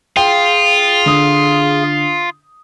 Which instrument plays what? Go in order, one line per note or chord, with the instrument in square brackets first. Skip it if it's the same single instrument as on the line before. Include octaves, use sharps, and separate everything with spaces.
[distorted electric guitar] F4 [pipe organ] G#4 F5 [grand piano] G5
[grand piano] D3 D#6